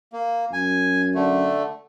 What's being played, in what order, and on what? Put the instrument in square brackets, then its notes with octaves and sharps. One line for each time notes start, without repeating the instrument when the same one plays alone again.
[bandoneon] A#3
[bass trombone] F#2 [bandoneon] G#5
[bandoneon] D3 A3